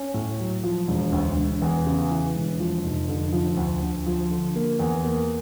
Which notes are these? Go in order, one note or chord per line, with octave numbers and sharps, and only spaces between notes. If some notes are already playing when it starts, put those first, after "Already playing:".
Already playing: C#4
A2
F#3
F3
E1
D2
E1
E2
C#3
E3
E1
F3
F1
D3
F3
D2
D2
F3
D3
A#3
E2
A#3